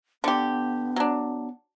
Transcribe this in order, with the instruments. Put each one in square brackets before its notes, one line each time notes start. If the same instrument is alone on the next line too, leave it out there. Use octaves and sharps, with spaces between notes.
[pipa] D3 G4 [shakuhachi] B3
[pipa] F#3 D4